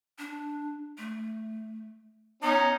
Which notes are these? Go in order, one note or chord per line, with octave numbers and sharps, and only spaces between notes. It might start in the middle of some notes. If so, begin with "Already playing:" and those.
D4
A3
B3 C#4 D#4